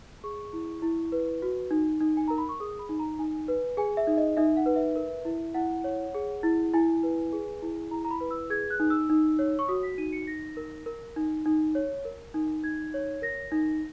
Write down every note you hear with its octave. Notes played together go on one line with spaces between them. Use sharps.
G#4 C#6
E4
E4
B4
F#4
D#4
D#4
G#5
A#4 A#5
B5
C#6
G#4 D#6
B5
D#4
A#5
D#4 G#5
B4
G#4 G#5
E5
D#4
D#5
D#4 E5
F#5
B4
E5
A#4
E4
E4 F#5
C#5
G#4
E4
E4 G#5
B4
G#4
E4
E4 A#5
A#5
B5
B4
E6
G#4 G#6
F#6
D#4
E6
D#4
C#5
C#6
F#4 D#6
B6
D#4 D#7
C#7
D#4 A#6
A#4
A#4
D#4
D#4
C#5
A#4
D#4
D#4 G#6
C#5
A#4 A#6
D#4